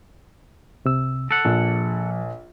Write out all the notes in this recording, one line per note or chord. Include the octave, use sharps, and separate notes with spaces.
C2 C3 E6
A4 F#5
A#1 F3